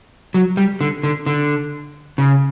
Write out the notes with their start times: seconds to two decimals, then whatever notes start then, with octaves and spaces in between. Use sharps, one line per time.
0.34 F#3
0.57 G3
0.81 D3
1.03 D3
1.26 D3
2.18 C#3